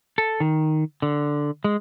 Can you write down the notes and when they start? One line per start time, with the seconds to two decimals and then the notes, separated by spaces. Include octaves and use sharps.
0.18 A4
0.40 D#3
1.02 D3
1.64 G#3